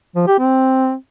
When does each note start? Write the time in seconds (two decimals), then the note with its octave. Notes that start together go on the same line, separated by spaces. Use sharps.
0.16 F3
0.27 G4
0.39 C4